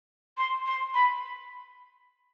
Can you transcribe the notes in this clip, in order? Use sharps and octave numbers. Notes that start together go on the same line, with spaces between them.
C6
C6
B5